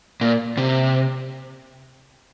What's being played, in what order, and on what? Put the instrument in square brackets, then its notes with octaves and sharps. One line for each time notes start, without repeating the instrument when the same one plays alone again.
[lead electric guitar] A#2
C3